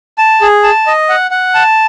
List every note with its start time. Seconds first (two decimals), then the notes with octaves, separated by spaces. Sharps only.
0.18 A5
0.41 G#4
0.63 A5
0.87 D#5
1.09 F#5
1.31 F#5
1.54 A5